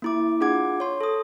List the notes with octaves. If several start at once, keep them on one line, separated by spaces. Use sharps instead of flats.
A#3 E4 D6
D4 F4 G#4 F#5 D6 G#6
C#5 C6
A4 D#6